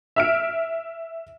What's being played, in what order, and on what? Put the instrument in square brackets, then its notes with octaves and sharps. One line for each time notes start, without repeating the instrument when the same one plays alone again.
[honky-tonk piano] E5 F6 D7